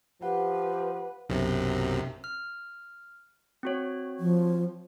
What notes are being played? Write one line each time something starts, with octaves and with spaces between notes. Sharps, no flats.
F3 G4 B4 F#5
B1 F#2 C3
F6
C4 F#4 C#5
F3